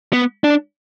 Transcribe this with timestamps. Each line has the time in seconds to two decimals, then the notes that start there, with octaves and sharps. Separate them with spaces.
0.13 B3
0.44 D4